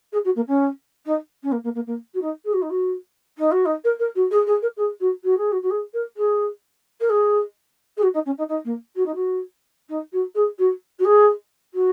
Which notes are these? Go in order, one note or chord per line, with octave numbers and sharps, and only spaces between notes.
G#4
F#4
A#3
C#4
D#4
C#4
A#3
A#3
A#3
A#3
F#4
D#4
G#4
F#4
D#4
F#4
D#4
F#4
D#4
A#4
A#4
F#4
G#4
G#4
A#4
G#4
F#4
F#4
G#4
F#4
F#4
G#4
A#4
G#4
A#4
G#4
G#4
F#4
D#4
C#4
D#4
D#4
A#3
F#4
D#4
F#4
D#4
F#4
G#4
F#4
F#4
G#4
F#4